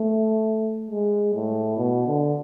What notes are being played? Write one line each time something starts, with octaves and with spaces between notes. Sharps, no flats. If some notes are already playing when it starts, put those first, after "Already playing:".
Already playing: A3
G#3
A2
B2
D3